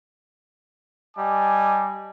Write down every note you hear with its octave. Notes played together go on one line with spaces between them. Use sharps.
G3 D#5 G#5 A5 D6